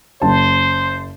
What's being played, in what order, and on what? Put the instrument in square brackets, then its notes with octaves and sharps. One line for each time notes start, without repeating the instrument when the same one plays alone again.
[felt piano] F#1 A5 [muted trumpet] C5